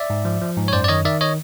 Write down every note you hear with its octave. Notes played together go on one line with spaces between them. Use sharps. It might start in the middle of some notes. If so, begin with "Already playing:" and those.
Already playing: D5 E5
G#2
F3
F3
G#2
C#5
F#2 C5 D5
D5
D#3 C#5 D#5
D#3 D5 E5
C#5 D#5